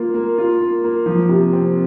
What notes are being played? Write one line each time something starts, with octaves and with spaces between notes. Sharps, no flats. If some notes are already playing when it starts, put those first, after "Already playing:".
Already playing: A#3 F4
A#3
F4
A#3
A#3
F3
C3
C4